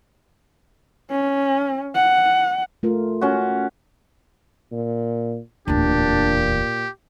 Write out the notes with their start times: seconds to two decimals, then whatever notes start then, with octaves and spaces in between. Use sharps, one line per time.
1.10 C#4
1.95 F#5
2.83 A3 F4 A#4
3.21 C#4 F#4
4.72 A#2
5.68 D1 E2 A#2 D4 G4